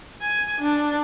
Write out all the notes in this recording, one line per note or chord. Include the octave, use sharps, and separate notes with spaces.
G#5
D4